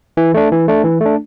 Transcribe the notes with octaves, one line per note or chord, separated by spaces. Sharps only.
E3
A3 D4
E3
A3 D4
E3
A3 D4